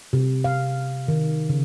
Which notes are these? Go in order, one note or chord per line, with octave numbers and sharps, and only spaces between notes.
C3
F5
D#3
C#3